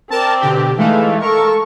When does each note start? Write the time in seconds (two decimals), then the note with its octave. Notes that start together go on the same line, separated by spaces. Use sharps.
0.10 C4 A#4 D5 A5
0.41 B2 D3 G4
0.77 E3 G#3 A3 D#4 F5
1.21 A4 A#4 C#6